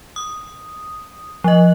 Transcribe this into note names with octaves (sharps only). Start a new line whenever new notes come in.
D#6
F3 D#5